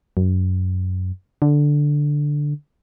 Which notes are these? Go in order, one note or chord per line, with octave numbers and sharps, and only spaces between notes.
F#2
D3